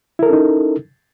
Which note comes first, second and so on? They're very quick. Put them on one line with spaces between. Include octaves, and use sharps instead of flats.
E4 A#4 A4 C#4 D#4